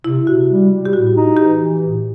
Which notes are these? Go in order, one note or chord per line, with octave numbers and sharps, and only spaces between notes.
C3 E4
C3 F#4
G3
G3
G4
A2 F#4
D#4
E3 G4
E3
A2